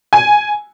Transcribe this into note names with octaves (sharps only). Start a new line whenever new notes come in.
G#5